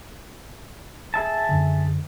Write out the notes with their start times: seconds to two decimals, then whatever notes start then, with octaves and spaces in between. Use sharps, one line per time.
1.14 G#4 E5 A5
1.49 F#2 D3